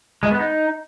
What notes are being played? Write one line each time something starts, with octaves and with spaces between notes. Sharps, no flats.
G#3
B3
D#4